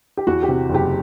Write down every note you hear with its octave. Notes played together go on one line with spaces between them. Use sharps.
G4
E2 F#4
G4
C3
F#1
G4